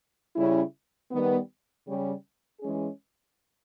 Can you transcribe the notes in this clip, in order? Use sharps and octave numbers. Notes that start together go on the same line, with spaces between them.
C#3 G3 C#4 E4
D#3 G3 B3
C#3 G3 C#4 G4
E3 G#3 C#4 G#4